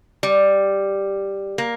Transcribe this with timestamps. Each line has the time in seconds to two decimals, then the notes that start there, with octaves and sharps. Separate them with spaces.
0.23 G3
1.58 A#3